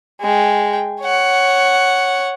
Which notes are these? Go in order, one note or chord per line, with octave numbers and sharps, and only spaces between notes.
G#3 G5
C#5 F#5